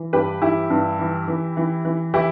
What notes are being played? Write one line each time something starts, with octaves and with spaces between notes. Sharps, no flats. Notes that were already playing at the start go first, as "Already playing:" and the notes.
Already playing: E3
G2 G4 B4
E3 E4 G4
G2
E3
E3
E3
E3
E3 E4 G4